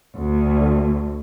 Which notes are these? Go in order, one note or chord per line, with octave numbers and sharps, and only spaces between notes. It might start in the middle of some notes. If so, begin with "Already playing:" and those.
D2